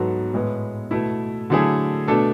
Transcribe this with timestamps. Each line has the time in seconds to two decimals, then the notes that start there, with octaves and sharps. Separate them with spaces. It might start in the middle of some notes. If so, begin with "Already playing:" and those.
Already playing: G#2 F#3 B3 F#4 A4
0.34 A2 G#3 B3
0.91 B2 A3 E4
1.50 D3 F#3 A3 E4 G#4
2.07 B2 A3 D4 A4